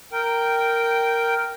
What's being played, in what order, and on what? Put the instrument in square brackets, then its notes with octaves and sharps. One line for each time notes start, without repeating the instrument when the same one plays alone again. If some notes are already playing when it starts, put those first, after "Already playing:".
[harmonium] A#4 G5